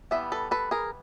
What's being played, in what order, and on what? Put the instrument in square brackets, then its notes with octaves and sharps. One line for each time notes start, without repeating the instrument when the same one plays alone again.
[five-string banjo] E3 G3 B3 E5
A4 B4
A4 B4
G#4 A#4